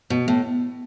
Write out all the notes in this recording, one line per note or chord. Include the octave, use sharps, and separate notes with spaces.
B2
A2